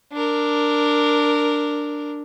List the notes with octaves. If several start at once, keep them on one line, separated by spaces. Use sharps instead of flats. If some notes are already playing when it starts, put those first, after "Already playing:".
D4 A#4